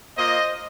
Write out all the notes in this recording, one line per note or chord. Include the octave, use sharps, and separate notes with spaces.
A#3 F4 C5 D#5